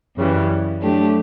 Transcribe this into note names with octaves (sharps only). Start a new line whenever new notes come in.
F#2 C#3 E3 G3
F#3 A3 D4 G4